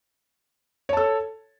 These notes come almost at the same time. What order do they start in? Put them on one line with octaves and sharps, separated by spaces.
C#5 A5 A4